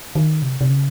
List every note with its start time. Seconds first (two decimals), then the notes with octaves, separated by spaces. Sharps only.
0.15 D#3
0.42 C3
0.61 C3
0.70 C#3